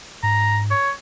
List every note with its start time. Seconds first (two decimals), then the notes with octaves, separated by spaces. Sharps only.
0.23 G#2 A#5
0.71 C#5